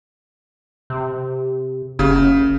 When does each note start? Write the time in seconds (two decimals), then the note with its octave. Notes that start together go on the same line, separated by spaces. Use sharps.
0.90 C3
1.99 F#1 C#3